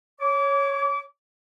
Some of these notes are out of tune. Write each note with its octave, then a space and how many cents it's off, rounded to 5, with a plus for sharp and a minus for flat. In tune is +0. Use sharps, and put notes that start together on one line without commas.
C#5 +0 D6 -30